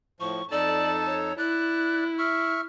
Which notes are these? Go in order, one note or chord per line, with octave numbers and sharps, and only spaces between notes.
A2 F3 C#6
F2 D#4 A4 D5 A5
C#5
E4 D5 F#6
E5 C#6 F6